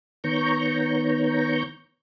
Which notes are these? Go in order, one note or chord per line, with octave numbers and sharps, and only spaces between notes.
D#3 B3 C#5 A#5 C#6 G6